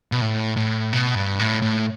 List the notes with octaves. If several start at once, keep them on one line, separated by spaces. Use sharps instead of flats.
B2
A2
A2
B2
G2
A2
A2